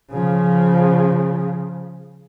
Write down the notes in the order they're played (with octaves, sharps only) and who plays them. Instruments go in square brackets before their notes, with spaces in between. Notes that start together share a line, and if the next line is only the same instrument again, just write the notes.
[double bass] C#3 F3